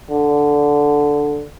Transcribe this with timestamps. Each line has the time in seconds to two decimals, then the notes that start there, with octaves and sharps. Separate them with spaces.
0.10 D3